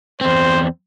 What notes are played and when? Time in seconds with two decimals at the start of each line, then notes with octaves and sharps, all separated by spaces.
0.21 E2 C4 C5